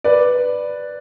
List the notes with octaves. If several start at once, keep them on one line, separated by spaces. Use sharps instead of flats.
B4 D5